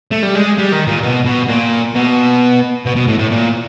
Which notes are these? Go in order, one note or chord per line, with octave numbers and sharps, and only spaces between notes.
A3
G3
G#3
G3
D#3
A#2
B2
B2
A#2
B2
B2
B2
A2
A2
A#2